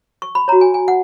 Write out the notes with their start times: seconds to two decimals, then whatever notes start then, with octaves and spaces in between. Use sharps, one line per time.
0.22 C#6
0.35 B5
0.48 F#4 C#5 A#5
0.61 G#5
0.74 G#5
0.88 F#5